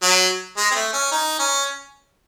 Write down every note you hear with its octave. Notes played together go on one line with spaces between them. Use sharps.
F#3
G#3
C4
A3
C#4
D#4
C#4